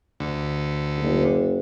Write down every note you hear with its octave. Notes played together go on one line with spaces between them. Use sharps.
D2
F#1